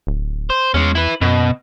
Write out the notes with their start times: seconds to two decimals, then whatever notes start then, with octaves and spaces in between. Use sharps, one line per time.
0.07 D1
0.50 C5
0.74 E2 G#3 C#4
0.95 E4 B4
1.21 F#2 B2